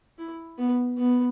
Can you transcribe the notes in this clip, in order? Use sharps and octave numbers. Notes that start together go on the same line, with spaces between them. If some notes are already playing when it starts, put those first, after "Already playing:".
E4
B3
B3